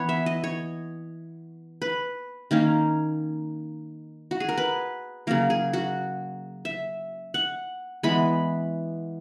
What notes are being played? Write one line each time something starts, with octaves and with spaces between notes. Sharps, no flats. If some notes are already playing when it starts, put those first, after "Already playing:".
Already playing: E3 B3 B4 C#5
E5
D#5
C#5
B4
D#3 A#3 C#4
F#4
G#4
A#4
B4
C#3 F#3 A#3 A#4
G#4
F#4
E5
F#5
E3 G#3 B3 B5